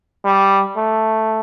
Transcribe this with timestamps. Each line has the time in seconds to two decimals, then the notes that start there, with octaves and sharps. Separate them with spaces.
0.25 G3
0.76 A3